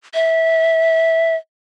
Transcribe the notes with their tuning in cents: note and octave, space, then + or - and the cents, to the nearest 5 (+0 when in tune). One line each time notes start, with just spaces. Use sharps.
E5 -15